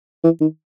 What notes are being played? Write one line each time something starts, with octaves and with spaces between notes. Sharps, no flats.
E3
D#3